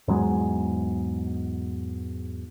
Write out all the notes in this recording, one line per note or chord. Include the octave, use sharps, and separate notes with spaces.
E2 G#2 F#3 G#3